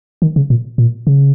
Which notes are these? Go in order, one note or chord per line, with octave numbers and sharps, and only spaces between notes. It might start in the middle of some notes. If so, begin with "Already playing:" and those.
D#3
C#3
A#2
A#2
C#3